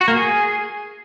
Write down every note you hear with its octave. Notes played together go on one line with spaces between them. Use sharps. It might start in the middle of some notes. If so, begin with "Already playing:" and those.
F#4
A#3
G#4